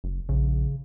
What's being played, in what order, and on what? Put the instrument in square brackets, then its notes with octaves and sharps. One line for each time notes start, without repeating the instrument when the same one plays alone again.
[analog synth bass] F#1
[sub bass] A#1 [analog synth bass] C#3